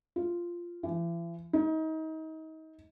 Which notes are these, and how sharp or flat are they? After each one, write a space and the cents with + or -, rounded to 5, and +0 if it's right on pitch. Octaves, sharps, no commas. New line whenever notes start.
F4 -5
E3 +40
D#4 +30